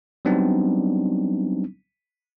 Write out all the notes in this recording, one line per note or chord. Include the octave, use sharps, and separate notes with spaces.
F#3 G3 B3 C4 D4 D#4